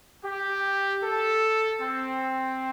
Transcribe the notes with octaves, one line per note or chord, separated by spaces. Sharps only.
G4
A4
C4